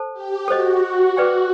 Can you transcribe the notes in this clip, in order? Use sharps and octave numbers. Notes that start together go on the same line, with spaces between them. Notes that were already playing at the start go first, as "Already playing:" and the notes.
Already playing: A4 C5 A5
G4
F#4 A4 C5 D#5
G#4 B4 D5 G5